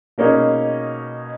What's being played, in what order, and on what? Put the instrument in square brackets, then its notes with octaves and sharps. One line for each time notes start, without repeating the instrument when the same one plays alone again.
[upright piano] B2 A#3 C#4 D#4 G#4